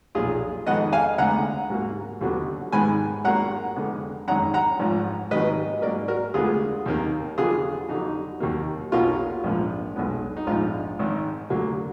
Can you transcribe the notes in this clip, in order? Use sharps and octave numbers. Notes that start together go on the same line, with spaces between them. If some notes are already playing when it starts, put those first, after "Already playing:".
B1 A#2 F3 F4 G#4
F2 D#3 G#3 B3 D#5 F#5
F5 G#5
D2 D3 G#3 B3 F#5 A#5
G#2 F#3 A#3
D#2 D3 F#3 B3
G#2 D#3 G#3 B3 G#5 B5
G#1 G#2 F#3 A#3 F#5 A#5
F2 D3 G#3 B3
G#1 F#2 D#3 G#3 F#5 A#5
F#5 A#5
G#1 G#2 F3
G#2 D#3 F#3 A#3 B4 D#5
G#2 F#3 A#3 A#4 D5
F#4 A#4
D2 D3 G#3 B3 F4 G#4
D#2 D#3 A#3
F2 D3 F#3 B3 F4 G#4
F2 D3 F#3 D#4
D#2 D#3 F#3 A#3
B1 B2 F#3 A#3 F4
A#1 G#2 F3 A#3
B1 B2 G#3 B3
D#4
A#1 G#2 F3 F4
G#1 G#2 D#3
D2 D3 F#3 A#3